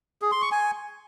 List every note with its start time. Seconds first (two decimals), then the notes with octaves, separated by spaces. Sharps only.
0.22 G#4
0.32 C6
0.42 C#6
0.52 G#5